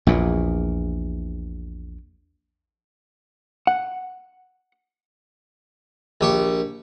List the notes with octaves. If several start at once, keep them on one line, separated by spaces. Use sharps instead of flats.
A#1 E2 A#2
F#5
A#1 G4 C#6